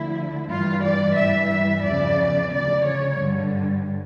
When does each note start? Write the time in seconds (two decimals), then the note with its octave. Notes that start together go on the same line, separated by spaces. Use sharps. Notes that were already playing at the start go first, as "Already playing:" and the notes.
Already playing: D2 D3 F3 E4
0.49 G2 E3 G3 F4
0.83 D5
1.17 G2 E3 G3 E5
1.51 E5
1.84 E2 C#3 F3 D5
2.52 D2 C#3 F3 D5
2.86 C#5
3.20 G2 D3 G3